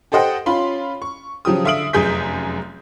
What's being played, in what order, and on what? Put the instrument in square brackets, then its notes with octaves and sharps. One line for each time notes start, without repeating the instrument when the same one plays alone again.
[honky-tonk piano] G4 A4 C5 D#5 F#5 G5
C#4 F4 B5 C6
C#6
C#3 F3 F#3 G4 D#6
D3 E5 F5 D#6 D7 F#7
F1 F#2 G#4 D#6 G6 B6